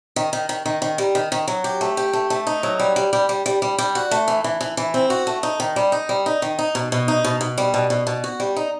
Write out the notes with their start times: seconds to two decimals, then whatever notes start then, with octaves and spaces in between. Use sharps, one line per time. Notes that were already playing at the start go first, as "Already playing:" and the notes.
0.16 D#3
0.33 D#3
0.49 D#3
0.66 D#3
0.82 D#3
0.98 G3
1.15 D#3
1.32 D#3
1.48 F#3
1.64 G4
1.81 A3
1.97 G4
2.13 A3
2.30 A3
2.47 D#4
2.63 F#3
2.79 G3
2.96 G3
3.13 G3
3.29 G3
3.46 G3
3.62 G3
3.78 G3
3.95 F#4
4.11 A3
4.28 E3
4.44 E3
4.61 E3
4.77 E3
4.94 C4
5.10 F#4
5.27 A3
5.43 D#4
5.60 D#3
5.76 G3
5.92 D#4
6.09 G3
6.26 D#4
6.42 D#3
6.59 D#4
6.75 B2
6.92 B2
7.08 D#4
7.24 B2
7.41 B2
7.58 G3
7.74 B2
7.90 B2
8.07 B2
8.24 F#4
8.40 G3
8.56 D#4